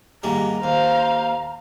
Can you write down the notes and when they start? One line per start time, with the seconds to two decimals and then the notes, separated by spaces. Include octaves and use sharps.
0.23 D#2 G#2 G3 A#5
0.64 D#2 C5 F5